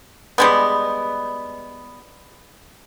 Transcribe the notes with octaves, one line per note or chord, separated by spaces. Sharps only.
G3 G#3 B3